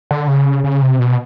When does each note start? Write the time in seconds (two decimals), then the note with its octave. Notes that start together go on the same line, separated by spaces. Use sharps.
0.11 D3
0.28 C#3
0.64 C#3
0.82 C3
0.99 B2